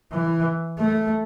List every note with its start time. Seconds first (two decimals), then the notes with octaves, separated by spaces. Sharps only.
0.12 E3
0.79 A3